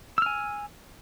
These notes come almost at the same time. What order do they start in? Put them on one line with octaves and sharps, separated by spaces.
E6 F6 G#5